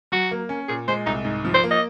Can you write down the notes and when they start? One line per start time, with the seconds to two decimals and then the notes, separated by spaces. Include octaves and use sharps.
0.12 F#3 F#4
0.31 A#3
0.49 C#4
0.69 A#2 G#4
0.88 G#3 C5
1.06 C2 D#4
1.25 G#2
1.45 F3
1.54 C5
1.64 A#3
1.71 D#5